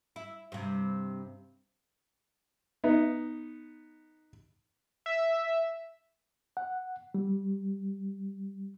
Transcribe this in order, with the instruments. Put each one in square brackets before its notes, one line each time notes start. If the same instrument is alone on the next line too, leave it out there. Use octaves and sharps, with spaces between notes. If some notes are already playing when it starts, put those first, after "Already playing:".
[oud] E4
G2 C3
[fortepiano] B3 D#4
[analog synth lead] E5
[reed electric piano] F#5
G3